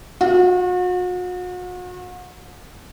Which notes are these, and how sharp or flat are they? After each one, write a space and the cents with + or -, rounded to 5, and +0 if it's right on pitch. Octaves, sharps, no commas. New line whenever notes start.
F#4 -40